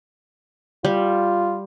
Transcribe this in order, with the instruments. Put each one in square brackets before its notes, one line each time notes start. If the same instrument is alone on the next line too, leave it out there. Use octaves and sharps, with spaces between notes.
[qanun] G3 [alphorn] F4